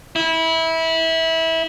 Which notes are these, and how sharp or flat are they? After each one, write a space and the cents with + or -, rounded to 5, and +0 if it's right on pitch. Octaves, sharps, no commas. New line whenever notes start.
E4 -20